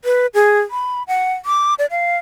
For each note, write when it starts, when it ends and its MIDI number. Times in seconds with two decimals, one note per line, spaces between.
0.05 0.27 71
0.34 0.60 68
0.71 1.03 83
1.08 1.33 78
1.45 1.74 86
1.79 1.86 74
1.91 2.17 77